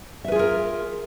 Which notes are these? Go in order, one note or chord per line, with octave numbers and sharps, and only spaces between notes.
F4 G#4 A#4 B4 E5